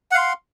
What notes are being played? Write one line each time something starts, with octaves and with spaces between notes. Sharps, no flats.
F5 F#5 C6